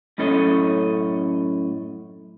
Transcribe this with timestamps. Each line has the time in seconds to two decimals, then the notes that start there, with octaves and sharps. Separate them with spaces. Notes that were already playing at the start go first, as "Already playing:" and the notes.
0.18 F#2 A2 C#4 A4 C#5 D#5